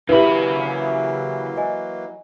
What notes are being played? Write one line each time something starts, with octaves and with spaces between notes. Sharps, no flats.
C#3 E3 F#3 A#3 E4 G4 B4 B5
D#5 G#5